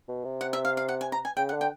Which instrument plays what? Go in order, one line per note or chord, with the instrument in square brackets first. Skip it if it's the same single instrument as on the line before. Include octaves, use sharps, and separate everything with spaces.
[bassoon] B2
C3
[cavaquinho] F#5
E5
F5
F5
F#5
G#5
A#5
G#5
[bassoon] C#3 [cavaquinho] G5
[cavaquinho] F#5
[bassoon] D3
[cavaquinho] G5